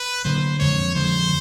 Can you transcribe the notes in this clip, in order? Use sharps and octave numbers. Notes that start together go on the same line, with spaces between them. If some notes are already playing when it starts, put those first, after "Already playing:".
Already playing: B4
D3 F#3 A#3 C5
F2 D3 F3 G#3 C#5
F2 D3 F3 G#3 C5